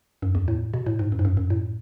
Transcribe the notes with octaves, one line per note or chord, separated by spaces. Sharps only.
F#2
E2
A2
B2
A2
G#2
F#2
G#2
F#2
F#2
A2